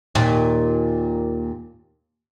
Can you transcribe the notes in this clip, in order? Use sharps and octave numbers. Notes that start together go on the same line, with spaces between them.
D#2 A#2